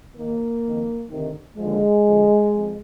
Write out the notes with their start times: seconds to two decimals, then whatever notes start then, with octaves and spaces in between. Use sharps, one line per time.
0.16 D#2 D#3 A#3
0.64 F2 D#3
1.10 D2 C3 D#3
1.57 D#2 D3 F3 G#3
2.05 F2 D3 F3
2.52 F2